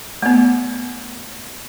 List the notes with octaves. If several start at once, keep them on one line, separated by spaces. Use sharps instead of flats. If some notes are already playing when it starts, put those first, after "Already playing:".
A3 B3